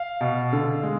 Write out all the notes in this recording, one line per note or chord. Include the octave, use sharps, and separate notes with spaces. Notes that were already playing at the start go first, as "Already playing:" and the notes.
Already playing: F5
B2
D3
G#3